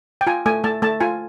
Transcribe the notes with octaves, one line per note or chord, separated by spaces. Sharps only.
G5
F4 G#5
A3 G#5
A3 A5
A3 A5
F4 G#5